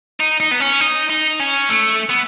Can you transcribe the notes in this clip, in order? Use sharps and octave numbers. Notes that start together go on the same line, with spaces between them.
D#4
D#4
B3
C#4
D#4
D#4
C#4
A3
B3